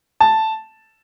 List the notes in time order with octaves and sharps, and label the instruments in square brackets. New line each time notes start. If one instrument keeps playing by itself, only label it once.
[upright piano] A5